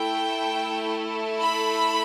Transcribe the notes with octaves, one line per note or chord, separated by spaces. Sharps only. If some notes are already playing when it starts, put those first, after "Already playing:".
Already playing: A3 E4 A4 G5
B5